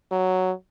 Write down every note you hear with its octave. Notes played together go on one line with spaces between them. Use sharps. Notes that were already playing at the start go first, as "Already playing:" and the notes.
F#3